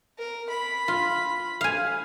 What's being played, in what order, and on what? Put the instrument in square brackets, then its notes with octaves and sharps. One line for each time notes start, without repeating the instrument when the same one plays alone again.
[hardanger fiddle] A#4
B5
[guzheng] F4
F5 G#5